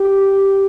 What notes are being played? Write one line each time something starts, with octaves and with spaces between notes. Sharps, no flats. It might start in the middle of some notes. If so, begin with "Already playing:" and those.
Already playing: G4